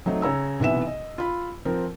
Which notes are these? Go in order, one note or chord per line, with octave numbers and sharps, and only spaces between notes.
F#3 A3 C4 D#4
C#3 C#5 A#5 E6
B1 C3 E3 B3 E5 E7
D#5
F4 B5
F3 C4 A#4